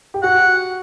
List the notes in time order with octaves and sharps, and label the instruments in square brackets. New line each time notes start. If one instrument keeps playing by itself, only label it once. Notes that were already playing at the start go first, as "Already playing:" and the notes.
[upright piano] G4
[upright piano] F#4 [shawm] F#5